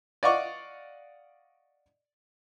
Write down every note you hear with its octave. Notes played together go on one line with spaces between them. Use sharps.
D5 D#5 F5 F#5 C#6 D6